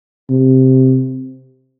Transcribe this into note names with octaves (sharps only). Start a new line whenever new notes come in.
C3